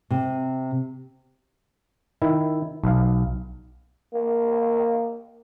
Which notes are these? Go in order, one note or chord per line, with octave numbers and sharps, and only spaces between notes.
C3
D#3 E4
B1 F5
A#3